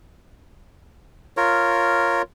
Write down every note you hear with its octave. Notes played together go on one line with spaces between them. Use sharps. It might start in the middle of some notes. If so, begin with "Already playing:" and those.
F4 A#4 C#5